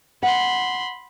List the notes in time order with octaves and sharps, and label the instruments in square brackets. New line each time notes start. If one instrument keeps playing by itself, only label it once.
[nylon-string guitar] F#5 [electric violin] B5 C6